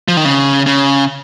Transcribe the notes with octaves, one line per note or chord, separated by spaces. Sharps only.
F3
D#3
C#3
C#3